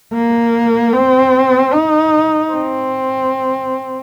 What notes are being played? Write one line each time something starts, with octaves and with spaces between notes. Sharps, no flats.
A#3
C4
D#4
C4